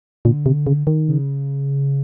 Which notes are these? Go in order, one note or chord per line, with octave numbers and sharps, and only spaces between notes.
A#2 D3
C3
C#3
D#3
C#3